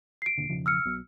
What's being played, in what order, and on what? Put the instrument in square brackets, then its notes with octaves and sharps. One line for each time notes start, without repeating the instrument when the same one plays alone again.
[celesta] C7 D7
[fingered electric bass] D#1 A#2 D3
E1 C#3 F3
[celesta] E6 F6 C#7
[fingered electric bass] B1 B2